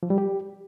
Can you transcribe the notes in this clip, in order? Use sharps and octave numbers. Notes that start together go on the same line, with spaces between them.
F3
G3
G4